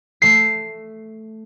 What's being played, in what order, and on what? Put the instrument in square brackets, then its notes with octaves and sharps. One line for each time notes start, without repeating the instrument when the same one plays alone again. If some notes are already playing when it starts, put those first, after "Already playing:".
[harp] A3 C7